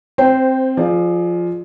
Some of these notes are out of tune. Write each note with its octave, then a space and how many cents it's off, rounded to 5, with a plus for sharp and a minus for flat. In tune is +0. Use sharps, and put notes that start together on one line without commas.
C4 +5 C5 -15 G5 +0
F3 +0 G#4 +20 D5 +30